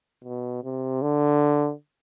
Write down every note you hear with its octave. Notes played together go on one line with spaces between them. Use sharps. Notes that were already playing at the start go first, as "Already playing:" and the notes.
B2
C3
D3